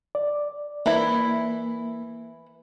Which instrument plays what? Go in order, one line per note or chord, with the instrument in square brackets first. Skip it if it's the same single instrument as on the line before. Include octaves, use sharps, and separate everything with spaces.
[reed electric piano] D5
[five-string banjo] E3 E4 [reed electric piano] A#3